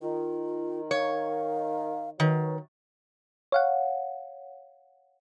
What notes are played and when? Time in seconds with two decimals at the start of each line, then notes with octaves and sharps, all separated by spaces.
0.02 D#3 F4
0.91 C#5 F5
2.20 D#3 F#3 B4
3.52 C#5 F5 F#5